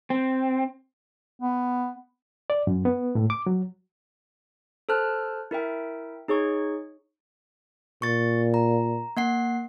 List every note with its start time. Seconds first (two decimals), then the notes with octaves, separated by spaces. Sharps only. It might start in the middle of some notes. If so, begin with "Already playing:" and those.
0.10 C4
1.41 B3
2.50 D5
2.67 F#2
2.85 B3
3.15 A2
3.30 D6
3.46 F#3
4.89 A4 C5 A5 F6 F#6
5.51 E4 A#4 E5 G5
6.28 D#4 G#4 C#5 C#6
8.02 A#2 C#6 A6
8.54 A#5
9.17 A#3 F#5 C7